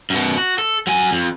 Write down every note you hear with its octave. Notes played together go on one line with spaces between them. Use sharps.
F#2 B2
F#4
A4
F#3 G#5
F2